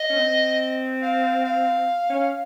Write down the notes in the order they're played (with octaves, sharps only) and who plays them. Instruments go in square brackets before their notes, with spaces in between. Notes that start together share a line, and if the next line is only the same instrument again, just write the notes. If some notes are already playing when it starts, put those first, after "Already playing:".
Already playing: [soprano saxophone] D#5
[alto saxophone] C#4
C4
[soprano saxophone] F5
F5
[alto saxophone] C#4